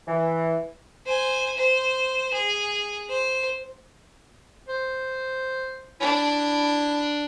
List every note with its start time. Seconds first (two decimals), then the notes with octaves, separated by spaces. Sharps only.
0.08 E3
1.06 C5 G#5
1.58 C5
2.33 G#4
3.09 C5
4.68 C5
6.01 D4 E4